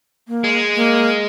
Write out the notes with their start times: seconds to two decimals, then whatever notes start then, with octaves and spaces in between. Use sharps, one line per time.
0.28 A#3
0.44 G#3
0.76 A#3